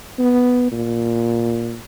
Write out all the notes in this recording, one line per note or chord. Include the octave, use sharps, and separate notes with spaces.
B3
A#2